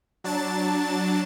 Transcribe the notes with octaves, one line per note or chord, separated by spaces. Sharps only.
F#3 D4 A5 A6